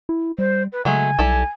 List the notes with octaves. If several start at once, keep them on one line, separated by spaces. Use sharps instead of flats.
E4
G3 C5
B4
C#3 F#3 G#3 A3 G#5
B1 G3 E4 A4